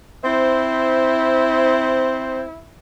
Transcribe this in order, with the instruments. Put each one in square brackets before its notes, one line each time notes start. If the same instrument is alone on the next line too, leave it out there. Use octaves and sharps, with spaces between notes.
[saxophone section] C4 C5 [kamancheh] E4